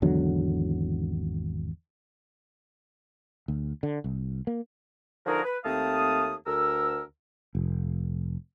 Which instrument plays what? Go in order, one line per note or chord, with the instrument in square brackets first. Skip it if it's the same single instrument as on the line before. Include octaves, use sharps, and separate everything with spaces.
[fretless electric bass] G#1 E2 D3 F#3
D2
D3
C2
A#3
[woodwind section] D3 F3 D#4 F#4 G#4 A#4
B4
D#2 A3 C4 F5 A5 D#6
D2 A#4 E6
[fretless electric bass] F1